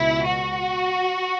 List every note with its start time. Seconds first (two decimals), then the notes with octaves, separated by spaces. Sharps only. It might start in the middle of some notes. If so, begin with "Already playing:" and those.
Already playing: C#2 B2 E4
0.25 F#4